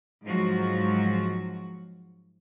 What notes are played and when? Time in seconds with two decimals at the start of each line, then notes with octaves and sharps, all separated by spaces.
0.23 G#2 F3 F#3 F#4